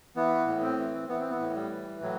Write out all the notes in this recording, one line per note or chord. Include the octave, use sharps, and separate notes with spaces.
E3 B3
A2
C4
E3
E3 B3
C4
B3
A2
G3
E3
A2 F#3